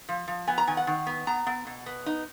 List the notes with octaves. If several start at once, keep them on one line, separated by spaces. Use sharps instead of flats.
F3
F3
B3 G#5
A#5
D#3 G#5
F#5
D#3
B3
B3 A#5
B3
B2
B3
D#4